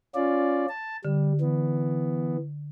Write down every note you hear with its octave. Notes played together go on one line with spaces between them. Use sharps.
C#4 F4 D5
A5
D3 G3
E3 B3